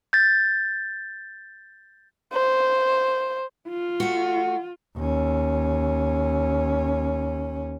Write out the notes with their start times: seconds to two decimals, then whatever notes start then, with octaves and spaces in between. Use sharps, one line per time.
0.13 G6 A6
2.33 C5
3.69 F4
4.00 A3 F#4
4.97 D#2 C#4